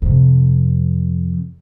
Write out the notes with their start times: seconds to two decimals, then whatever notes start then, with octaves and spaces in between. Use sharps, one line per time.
0.02 F2 C3